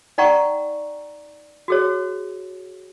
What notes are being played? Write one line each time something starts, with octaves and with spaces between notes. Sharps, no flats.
D#4 D5 F#5 G5 A#5 C#6
F#4 G#4 C#5